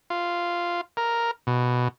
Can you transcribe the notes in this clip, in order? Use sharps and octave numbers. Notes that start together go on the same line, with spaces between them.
F4
A#4
B2